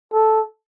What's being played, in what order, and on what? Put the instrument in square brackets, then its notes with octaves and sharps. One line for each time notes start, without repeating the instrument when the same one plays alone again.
[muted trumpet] A4